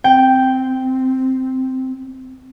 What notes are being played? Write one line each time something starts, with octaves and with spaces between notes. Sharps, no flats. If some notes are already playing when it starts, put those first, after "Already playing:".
C4 G5